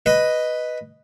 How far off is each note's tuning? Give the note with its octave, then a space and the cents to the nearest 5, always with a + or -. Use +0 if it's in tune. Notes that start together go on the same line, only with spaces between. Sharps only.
B4 +0 D#5 +0